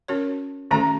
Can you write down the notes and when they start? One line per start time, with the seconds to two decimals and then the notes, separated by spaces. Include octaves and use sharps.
0.08 C#4 F#4 A#4 C#5
0.71 D#3 A3 C#4 F#4 A4 A#5